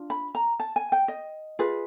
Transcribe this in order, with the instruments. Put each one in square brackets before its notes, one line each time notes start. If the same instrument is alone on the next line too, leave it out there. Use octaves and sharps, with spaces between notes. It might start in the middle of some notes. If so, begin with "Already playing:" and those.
Already playing: [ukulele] D4 F4
B5
A#5
A5
G#5
G5
D#5
F4 G#4 B4